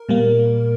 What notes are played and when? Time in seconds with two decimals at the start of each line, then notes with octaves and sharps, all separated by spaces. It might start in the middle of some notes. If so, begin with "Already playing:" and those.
Already playing: A#4
0.09 A#2 G3 A#3